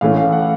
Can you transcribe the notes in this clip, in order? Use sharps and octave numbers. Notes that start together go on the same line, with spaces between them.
A2 E3 A3 C#4 F5
F5
F#5